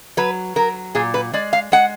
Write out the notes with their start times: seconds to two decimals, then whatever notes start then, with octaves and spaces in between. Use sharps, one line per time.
0.17 F#3 B4
0.56 F#3 A#4
0.95 A#2 G#4
1.14 B4
1.33 G#3 D5
1.53 F5
1.72 G#3 F#5